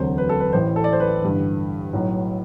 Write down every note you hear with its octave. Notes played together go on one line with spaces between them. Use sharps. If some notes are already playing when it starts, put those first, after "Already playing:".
Already playing: E1 D2 C3 F#3 C5
B4
A4
B4
A1 A2 E3 C5
A4
D5
C5
B4
A1 G2 D3
B1 A2 F#3